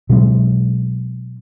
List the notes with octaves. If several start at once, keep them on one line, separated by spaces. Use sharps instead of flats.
B2 F#3 G#3 C4